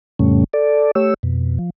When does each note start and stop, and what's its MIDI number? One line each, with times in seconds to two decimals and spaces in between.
0.19 0.44 41
0.19 0.44 45
0.19 0.44 49
0.19 0.44 55
0.19 0.44 57
0.19 0.44 61
0.53 0.91 69
0.53 0.91 74
0.95 1.14 57
0.95 1.14 67
0.95 1.14 73
0.95 1.14 88
1.23 1.58 41
1.23 1.58 47
1.59 1.70 53